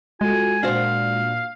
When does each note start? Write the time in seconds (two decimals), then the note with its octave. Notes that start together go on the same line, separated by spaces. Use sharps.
0.21 G#3 F4 F#4 A4 G#5
0.63 A#2 D4 F#4 C5 F5